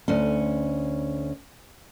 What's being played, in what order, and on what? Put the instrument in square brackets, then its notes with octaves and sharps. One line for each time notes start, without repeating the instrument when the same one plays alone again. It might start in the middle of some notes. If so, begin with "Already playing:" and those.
[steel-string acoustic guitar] D2 C#4